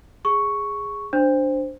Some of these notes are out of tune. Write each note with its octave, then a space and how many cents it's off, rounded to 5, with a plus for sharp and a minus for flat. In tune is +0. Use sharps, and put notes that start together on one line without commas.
G#4 -10 C#6 +0
D4 +0 C5 +0